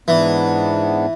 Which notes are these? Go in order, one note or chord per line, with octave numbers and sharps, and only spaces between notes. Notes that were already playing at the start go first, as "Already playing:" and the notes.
G#2 E3 B3 D4